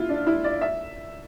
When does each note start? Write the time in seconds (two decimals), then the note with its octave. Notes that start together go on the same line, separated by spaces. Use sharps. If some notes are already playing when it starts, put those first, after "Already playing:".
Already playing: E4 F4
0.09 D4
0.27 E4
0.44 D5
0.61 E5